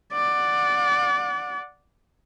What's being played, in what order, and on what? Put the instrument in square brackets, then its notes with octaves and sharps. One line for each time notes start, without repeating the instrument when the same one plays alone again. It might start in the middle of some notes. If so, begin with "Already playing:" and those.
[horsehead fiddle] D5 F#5